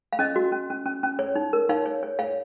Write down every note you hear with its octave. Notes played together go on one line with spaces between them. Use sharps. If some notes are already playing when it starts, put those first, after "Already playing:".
F5
C#4 D#5
F#4
C#4
C#4
C#4
C#4
C#5
D#4
A#4
D#4 C#5 F5
C#5
C#5
C#5 F5